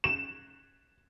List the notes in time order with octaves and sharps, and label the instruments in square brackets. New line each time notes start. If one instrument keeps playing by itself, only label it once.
[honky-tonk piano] E7